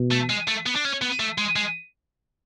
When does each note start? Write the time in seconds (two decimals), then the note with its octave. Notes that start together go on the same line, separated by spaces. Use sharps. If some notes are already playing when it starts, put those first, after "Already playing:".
Already playing: B2
0.12 A3
0.30 G#3
0.48 A3
0.66 B3
0.75 D4
0.85 C#4
1.02 B3
1.20 A3
1.38 G#3
1.56 G#3